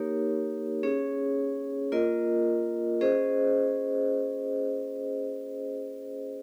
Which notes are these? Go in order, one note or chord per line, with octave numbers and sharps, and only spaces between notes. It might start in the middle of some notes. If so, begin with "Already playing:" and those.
Already playing: A#3 D#4 G4 A#4 C#5
C#4 G#4 C#5
A#3 F4 A#4 D#5
C#4 G#4 C5 D#5